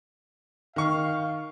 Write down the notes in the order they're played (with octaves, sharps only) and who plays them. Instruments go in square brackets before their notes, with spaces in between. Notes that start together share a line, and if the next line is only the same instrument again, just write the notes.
[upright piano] D#3 C#6 [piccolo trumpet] F5